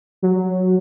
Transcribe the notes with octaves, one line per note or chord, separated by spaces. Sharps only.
F#3